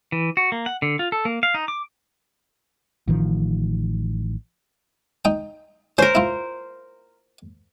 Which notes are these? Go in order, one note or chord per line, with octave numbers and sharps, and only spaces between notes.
E3
F#4
A#3
F#5
D3
F4
A4
A#3
F5
D#4
D6
A1 D#3 F3
D#4 G5
C#4 A#4 C5
E4 F4